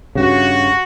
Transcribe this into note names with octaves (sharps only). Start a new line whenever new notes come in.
G2 C#3 F#4